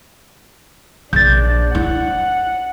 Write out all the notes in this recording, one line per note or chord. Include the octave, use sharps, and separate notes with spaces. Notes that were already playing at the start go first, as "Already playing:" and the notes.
A#1 D4 G6 A6
E4 F#5